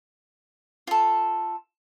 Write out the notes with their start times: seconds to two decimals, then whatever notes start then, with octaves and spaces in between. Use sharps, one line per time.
0.87 F4 A4